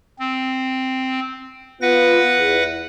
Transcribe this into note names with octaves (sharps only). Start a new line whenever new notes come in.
C4
B3 F4 B4 F#5 A#6
E2